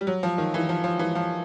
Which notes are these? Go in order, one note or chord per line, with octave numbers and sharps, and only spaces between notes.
G3
F#3
F3
D#3
E3
F3
F3
E3
F3